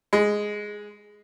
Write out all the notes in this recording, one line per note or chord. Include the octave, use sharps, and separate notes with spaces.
G#3